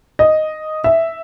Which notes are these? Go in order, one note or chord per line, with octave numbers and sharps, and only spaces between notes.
D#5
E5